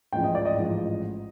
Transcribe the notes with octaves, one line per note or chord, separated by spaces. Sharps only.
A1 G#2 F3 G5
D#5
D5
D#5
A1 G#2 F3